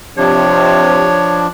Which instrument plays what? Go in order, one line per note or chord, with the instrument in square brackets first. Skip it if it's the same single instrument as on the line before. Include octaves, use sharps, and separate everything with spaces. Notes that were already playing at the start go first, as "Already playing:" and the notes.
[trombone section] C3 [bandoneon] F3 D4 [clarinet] C#5